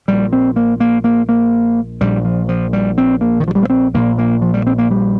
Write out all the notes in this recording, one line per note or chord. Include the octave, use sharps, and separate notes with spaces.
A#1 A#2 G3
C4
A#3
A#3
A#3
A#3
A#1 A#2 G3
F3
F3
G3
C4
A#3
D#3
F3
G3
A#3
C4
A#1 A#2 A#3
A#3
F3
G3
C4
A#3
G3